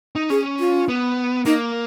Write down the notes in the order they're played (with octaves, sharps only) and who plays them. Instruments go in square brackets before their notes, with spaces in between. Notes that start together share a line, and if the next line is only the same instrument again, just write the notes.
[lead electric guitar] D#4
[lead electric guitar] C#4 [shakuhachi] G#4
[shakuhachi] F4
[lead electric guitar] B3
[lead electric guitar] A#3 [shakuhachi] D#4